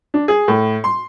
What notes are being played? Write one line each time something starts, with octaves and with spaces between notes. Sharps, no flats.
D4
G#4
A2
C6